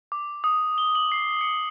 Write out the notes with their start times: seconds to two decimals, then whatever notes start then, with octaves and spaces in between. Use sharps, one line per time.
0.12 D6
0.44 D#6
0.78 G7
0.95 F#7
1.12 C7
1.41 C#7